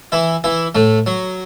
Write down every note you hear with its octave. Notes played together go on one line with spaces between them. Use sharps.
E3 E4
E3 E4
A2 A3
F#3